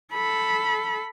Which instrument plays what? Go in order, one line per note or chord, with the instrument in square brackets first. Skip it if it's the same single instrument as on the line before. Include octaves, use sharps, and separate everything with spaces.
[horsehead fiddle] A4 B5